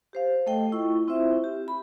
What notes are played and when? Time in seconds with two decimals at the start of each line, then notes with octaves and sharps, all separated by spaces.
0.13 G4 C5 F5
0.46 A3 A4 D#5 G5
0.72 E4 F4 C#6
1.08 C4 E4 F4 C5 E5
1.44 G4
1.68 B5